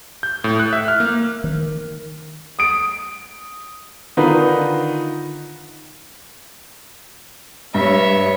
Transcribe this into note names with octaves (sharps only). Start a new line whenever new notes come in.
G6
A2
F#6
E5
F6
A#3
D#3
D#6 D7
D3 D#3 D#4 F4 B4
G2 C#5 E5